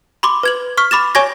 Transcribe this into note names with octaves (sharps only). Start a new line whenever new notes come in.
B5 C6 D6
B4 G#6 F#7
C#6 F6 B6
B5 D6 A6 E7
C#5 G#5 C#6 G#6 A#6